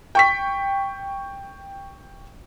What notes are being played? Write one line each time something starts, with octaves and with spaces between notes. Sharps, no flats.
G5 C#6 B6